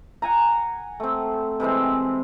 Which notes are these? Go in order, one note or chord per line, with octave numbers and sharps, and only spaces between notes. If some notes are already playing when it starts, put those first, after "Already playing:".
F#5 G#5 A#5
A3 C4
C3 E3 G#3 C4